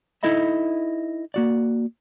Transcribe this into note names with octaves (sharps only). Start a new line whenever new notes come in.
D#4 E4 A4 D#5 E5 B5
A#3 F#4 D5